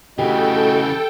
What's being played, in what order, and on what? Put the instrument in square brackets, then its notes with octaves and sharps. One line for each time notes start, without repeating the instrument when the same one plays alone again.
[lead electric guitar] C#3 E3 [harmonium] A3 F#4 D#5 [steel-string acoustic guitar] G4 [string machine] A4 G5